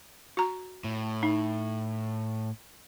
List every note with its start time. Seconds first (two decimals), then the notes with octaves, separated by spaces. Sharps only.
0.37 F#4 A#5
0.84 A2
1.23 D#4